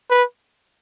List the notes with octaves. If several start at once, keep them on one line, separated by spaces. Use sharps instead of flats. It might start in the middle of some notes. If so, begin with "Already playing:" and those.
B4